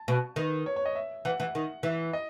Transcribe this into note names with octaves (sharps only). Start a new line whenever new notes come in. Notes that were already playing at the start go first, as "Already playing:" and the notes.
Already playing: A5
B2
D#3 B4
C#5
C#5
D#5
E5
E3 F#5
E3 F#5
D#3
E3 E5
D#5